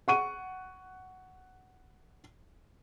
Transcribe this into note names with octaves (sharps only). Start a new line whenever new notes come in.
F#5 C#6 D#7